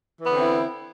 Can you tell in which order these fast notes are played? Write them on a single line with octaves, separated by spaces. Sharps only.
E3 B3 D3 C4 E4